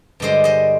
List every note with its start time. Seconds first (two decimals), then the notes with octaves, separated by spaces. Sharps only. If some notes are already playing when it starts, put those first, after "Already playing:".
0.20 G2 D3 G#3 C5 D#5
0.44 C5 D#5